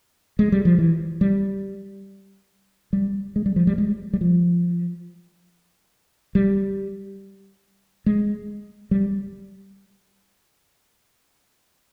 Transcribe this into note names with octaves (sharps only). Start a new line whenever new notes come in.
G#3
G3
F3
E3
G3
G3
G#3
G3
F3
G3
G#3
G3
F3
G3
G#3
G3